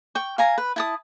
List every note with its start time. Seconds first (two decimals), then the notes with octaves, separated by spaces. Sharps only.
0.15 G5 C#6
0.38 F5 G#5 A#5
0.58 B4
0.76 E4 A5 D#6